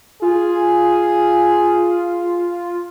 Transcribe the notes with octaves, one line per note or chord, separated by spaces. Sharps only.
F4 G#4